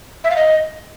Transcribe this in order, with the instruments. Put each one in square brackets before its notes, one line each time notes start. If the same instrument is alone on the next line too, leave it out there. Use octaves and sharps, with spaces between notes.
[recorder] E5
F5
D#5